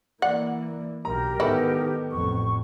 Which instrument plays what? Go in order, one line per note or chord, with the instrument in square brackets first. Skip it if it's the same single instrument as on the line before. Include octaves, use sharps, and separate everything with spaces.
[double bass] E3 A#3 [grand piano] D5 [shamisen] F#5
[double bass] B1 [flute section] G4 A#4 [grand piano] A#5
[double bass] G#2 D#3 [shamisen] E3 E4 [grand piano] B3 A4
[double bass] A1 F2 [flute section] C#6